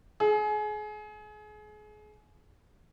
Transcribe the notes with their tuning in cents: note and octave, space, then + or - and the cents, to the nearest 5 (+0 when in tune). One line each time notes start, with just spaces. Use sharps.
G#4 +30